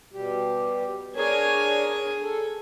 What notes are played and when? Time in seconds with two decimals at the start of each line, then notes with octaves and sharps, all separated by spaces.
0.13 B2 G3 G4
1.16 D4 G#4 A#4 C#5 G#5
2.22 A4